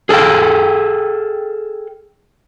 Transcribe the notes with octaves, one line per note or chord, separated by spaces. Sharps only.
G#4 A4 C5 F5 G5